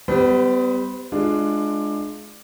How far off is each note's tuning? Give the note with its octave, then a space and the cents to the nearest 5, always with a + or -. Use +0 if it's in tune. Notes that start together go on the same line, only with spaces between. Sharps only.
G3 +0 B3 +35 C5 -5
G#3 +20 D4 +20 F4 -10